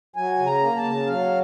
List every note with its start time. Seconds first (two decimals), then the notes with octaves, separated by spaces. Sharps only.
0.16 F#3 G#5
0.39 C#3
0.46 A#5
0.61 A#3
0.77 A5
0.84 C#3
1.07 F#3 F5